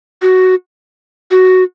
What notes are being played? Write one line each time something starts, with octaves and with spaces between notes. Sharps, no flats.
F#4
F#4